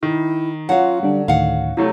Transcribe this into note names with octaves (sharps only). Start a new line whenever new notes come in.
D#3 E4
F#3 C#4 F4 F#4 F5 F#5
D3 G3 D4
D2 A2 D#3 F5 F#5
C3 F#3 A3 E4